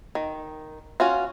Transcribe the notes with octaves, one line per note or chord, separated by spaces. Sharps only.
D#3
C#4 F4 F#4